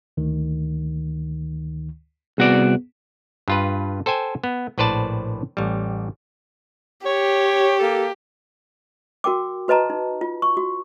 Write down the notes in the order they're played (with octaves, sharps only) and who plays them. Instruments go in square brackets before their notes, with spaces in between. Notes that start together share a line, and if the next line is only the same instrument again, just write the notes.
[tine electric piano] D2 D#3
[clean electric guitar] C2 F#4 D5 [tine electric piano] B3 G#4
[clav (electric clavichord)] G2 F4 B4
A4 C5 G5 G#5
B3
A#1 A2 B4 C5 D5 A5
A1 G3
[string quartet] G4 [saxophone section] C#5
[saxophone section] A#3 A4
[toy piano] F#4 A#4 G5 D6
F#4 B4 D#5 A5 A#5
D#4
F4
C#6
F#4